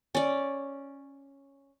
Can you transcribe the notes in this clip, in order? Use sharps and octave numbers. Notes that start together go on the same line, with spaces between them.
C#4 D5